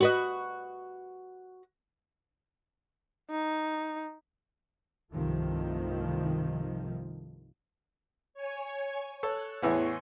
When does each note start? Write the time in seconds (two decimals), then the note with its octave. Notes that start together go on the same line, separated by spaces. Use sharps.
0.01 F#4 B4 D#5
3.30 D#4
5.11 C2 G2 C3 D#3 F3 A3
8.34 C#5 G#5
9.23 A4 C#5 F#6
9.62 E2 A2 E3 B3 G#5 C6 C#6